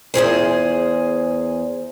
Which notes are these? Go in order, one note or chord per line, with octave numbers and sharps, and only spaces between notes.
E2 C3 G#4 C5